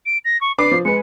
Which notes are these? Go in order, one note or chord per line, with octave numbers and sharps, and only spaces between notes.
D7
A#6
C#6
D4 B4 D6 C7
F3
G#3 B4 C#7